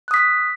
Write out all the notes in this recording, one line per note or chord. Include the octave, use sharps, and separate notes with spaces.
D#6 F#6 B6